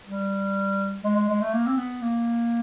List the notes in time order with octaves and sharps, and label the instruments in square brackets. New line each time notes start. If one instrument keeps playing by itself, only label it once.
[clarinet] G3
G#3
G#3
G#3
A3
A#3
C4
B3
A#3